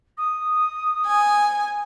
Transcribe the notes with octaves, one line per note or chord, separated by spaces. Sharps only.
D#6
G#5